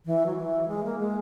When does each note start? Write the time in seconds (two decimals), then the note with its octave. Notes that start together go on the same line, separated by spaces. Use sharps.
0.06 E3
0.26 F#3
0.37 E3
0.68 G#3
0.84 A#3
0.99 G#3